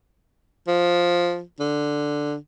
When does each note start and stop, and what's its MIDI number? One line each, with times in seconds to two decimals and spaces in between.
0.68 1.42 53
1.60 2.35 50